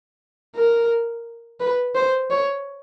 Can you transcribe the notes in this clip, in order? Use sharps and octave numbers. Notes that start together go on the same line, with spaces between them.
A#4
B4
C5
C#5